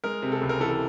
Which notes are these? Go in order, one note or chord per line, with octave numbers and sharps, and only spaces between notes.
G#3 A#4
C3
A4
C#2
A#4
E3 A4